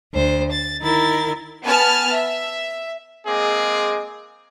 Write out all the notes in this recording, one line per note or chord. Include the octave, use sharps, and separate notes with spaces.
D2 C5
A6
D#3 E4 A#4 A6
B3 G#5 A5 F6
E5
G#3 A#3 C4 G#4 D#5 D6